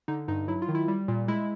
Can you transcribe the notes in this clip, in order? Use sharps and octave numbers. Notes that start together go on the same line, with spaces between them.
D3 D#4
G2 D#4
F#3 E4
F4
D#3
E4
G3
A#2
G#3 E4